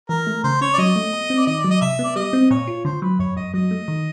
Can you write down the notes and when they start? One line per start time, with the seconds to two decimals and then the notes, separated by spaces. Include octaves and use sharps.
0.09 E3 A#4
0.27 A3
0.44 C#3 C5
0.61 C#4 C#5
0.74 D5
0.78 F#3 D#5
0.96 A3
1.13 B2
1.30 C4
1.38 D5
1.47 D#3 D#5
1.59 D5
1.64 F#3
1.70 D#5
1.81 C3 E5
1.99 B3
2.04 D5
2.16 G3 D#5
2.33 C4
2.50 A#2 C#5
2.67 F4
2.85 D3 C5
3.02 F#3 B4
3.19 F#2 C#5
3.36 F#2 D#5
3.54 F#3 D#5
3.71 A3
3.88 D#3